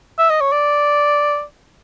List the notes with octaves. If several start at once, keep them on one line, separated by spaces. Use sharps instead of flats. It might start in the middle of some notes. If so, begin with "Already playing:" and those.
E5
D#5
C#5
D5